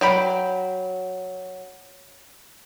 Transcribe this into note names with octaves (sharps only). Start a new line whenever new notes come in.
F#3 G5 B5